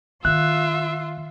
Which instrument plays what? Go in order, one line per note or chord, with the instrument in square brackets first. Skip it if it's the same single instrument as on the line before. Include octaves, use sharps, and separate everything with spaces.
[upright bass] D#3 E4 [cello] F4 [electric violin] E5 [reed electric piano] F#6